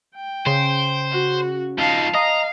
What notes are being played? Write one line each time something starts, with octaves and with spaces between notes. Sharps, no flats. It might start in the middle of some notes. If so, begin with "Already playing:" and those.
G5
C#3 C5
F#4
F3 D#4 F5 A5
D#5 F5 A#5